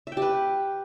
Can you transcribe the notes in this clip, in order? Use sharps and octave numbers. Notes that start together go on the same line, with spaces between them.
E5
G5
G4
B4